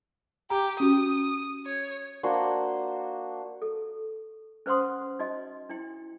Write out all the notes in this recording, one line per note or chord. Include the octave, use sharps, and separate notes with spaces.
G4 A#5
C#4 F#4 D#6
C#5
A#3 D4 F#4 C5
A4
C#4 B4 C5 F#5 C6 D#6
D#4 F#4 D#5
D4 E4 G5